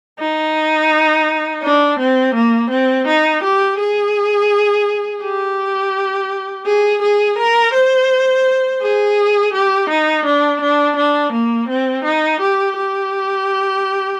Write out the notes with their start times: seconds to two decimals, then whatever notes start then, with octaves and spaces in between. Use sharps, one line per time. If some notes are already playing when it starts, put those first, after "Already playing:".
0.20 D#4
1.63 D4
1.99 C4
2.35 A#3
2.71 C4
3.08 D#4
3.43 G4
3.79 G#4
5.23 G4
6.66 G#4
7.02 G#4
7.38 A#4
7.74 C5
8.82 G#4
9.53 G4
9.89 D#4
10.25 D4
10.61 D4
10.97 D4
11.33 A#3
11.69 C4
12.04 D#4
12.41 G4
12.77 G4